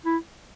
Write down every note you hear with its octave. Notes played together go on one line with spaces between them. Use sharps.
E4